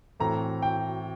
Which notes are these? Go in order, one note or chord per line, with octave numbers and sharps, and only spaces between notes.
A2 E3 A3 C4 A#5
G5